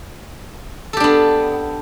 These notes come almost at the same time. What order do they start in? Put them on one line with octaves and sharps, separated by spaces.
A4 G4 D4 B3